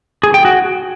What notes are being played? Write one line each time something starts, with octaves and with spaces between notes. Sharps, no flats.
G#4
G5
F#4